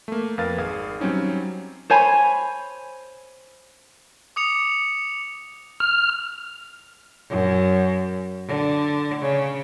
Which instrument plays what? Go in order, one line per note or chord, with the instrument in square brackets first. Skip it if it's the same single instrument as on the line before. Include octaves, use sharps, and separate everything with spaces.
[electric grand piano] A3 A#3
F2 A#4 B4 F5 A6
G#1 G#4 F5
F#3 G3 C4 C#4 D#4
[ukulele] C5 C#5 G#5 B5
[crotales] D6 D#6 C#7 F7
[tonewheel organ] F6
[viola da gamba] F#2
D3
C#3